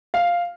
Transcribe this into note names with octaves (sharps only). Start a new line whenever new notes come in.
F5